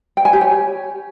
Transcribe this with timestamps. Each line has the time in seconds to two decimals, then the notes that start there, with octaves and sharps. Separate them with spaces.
0.17 G5
0.25 G#5
0.33 G4
0.41 C#5